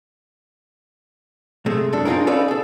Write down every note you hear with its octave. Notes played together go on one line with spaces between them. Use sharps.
C3 G#3 A3
F#2 D4 A4
C4 D4 D#4 F4 G#4 A#4
C#4 D#4 A4 B4 D5 F5
G#4 A4